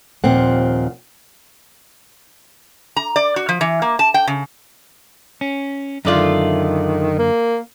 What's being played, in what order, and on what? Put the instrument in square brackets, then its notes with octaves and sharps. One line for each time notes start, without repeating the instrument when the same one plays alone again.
[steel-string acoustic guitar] D#2 A#2 F3 C4 F#5
[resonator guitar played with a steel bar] A#5
D5
F#4
F3
E3
A#3
A5
G5
C#3
[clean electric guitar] C#4
[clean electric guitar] F#2 D3 D5 [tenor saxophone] D#3 [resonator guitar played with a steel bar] G#3 A3 F4
[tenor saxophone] A#3